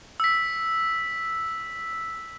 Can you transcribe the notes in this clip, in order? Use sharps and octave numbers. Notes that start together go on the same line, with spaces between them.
E6 B6